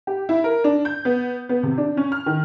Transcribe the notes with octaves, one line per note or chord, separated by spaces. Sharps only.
G4
E4
A#4
D4
G6
B3
B3
C3
D4
C#4
F6
D#3